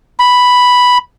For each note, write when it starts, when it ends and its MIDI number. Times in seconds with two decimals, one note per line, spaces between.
0.19 0.98 83